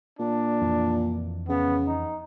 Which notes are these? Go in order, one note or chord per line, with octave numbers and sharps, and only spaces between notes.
A#2 D4
F2 E3
C#3 B3
D#4